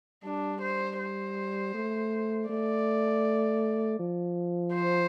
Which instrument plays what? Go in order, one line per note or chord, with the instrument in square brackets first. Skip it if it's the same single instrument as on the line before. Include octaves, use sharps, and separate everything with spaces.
[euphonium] G3 [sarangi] D4
[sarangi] C5
C5
[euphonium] A3
[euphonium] A3 [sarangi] D5
[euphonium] F3
[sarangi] C5